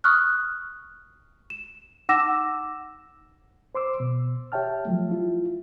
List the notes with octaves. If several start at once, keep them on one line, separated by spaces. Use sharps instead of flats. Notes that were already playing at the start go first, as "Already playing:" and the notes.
C#6 D#6 F6 F#6
E7
D#4 F#5 D6 E6 A#6 E7
C5 C6 D6 E6
B2
G4 C#5 E5 G5 A5 F6
F3 F#3 A3
E4 F4